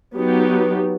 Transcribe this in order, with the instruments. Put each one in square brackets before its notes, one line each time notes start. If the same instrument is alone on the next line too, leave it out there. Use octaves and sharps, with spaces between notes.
[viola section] F#3 B3 D#4 G4